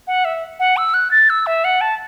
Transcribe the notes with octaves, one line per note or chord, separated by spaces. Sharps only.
F#5
E5
F#5
E6
F#6
A6
E6
E5
F#5
A5